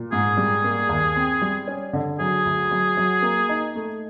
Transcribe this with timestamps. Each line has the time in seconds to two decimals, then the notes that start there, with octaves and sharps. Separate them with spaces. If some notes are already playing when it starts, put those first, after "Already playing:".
Already playing: A#2
0.12 G#2 G#4
0.37 G3
0.64 A#3
0.89 D#2
1.16 C4
1.42 G3
1.67 C#4
1.93 D3
2.19 F#3 G#4
2.45 D2
2.71 F#3
2.97 F#3
3.22 A#3
3.49 D#4
3.75 A3